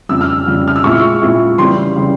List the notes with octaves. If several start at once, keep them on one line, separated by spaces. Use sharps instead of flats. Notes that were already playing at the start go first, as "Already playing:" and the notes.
F2 C#3 G3 E6
F6
F2 C#3 G3
F6
E6
A#2 G#3 C4 E4 C#6
A#2 G#3 C4 E4
C#3 E3 G3 C4 C6
C#3 E3 G3 C4